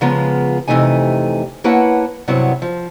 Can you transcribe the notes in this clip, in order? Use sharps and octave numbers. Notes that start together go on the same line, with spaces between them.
C#3 F3 G#3 B3 F4 A#5
F2 C3 E3 A3 D#4 G#5
A#3 E4 B4 C#5 F#5 A5
G2 C3 F#3 B3 E4 C#5
F3